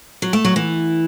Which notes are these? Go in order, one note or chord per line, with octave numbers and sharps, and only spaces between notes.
F#3
A3
F#3
E3